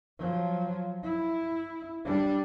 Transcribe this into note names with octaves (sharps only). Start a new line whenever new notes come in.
F3 F#3
E4
G3 D4